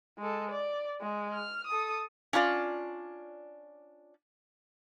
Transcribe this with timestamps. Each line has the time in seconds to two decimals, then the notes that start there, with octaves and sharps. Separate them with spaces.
0.18 G#3 A4
0.51 D5
1.01 G#3
1.34 F6
1.67 A4 D#6
2.33 C#4 D4 F4 D5